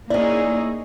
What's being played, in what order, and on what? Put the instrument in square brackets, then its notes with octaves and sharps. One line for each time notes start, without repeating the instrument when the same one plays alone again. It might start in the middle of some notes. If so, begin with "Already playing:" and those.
[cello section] A#3 D#4 G#4 [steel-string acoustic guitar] C#4 E4 [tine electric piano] D5